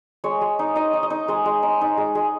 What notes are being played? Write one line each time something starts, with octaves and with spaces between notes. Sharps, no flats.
G#3 C#5
G#3
D#4
D#4 D#5
D#4
D#5
D#4
G#3 D#5
G#3
D#4
D#4
G#3
G#3